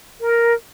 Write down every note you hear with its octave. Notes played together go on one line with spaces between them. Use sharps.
A#4